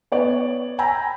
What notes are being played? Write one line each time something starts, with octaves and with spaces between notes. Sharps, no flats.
B3 C#5 D5
G5 G#5 A#5 B5 E6